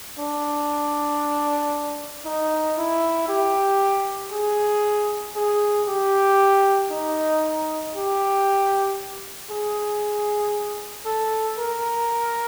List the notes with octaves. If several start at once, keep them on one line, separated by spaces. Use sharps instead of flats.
D4
D#4
E4
G4
G#4
G#4
G4
D#4
G4
G#4
A4
A#4